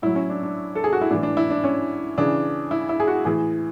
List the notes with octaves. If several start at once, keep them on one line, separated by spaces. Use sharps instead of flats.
A2 F#3 E4
C#4
D4
D4
A4
G#4
F#4
E4
A2 E3 D4
D4
E4
D4
C#4
C#3 E3 D4
E4
E4
G#4
F#4
A2 E3 G#4